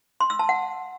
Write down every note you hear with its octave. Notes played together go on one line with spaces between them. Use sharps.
C6
E6
A5
F#5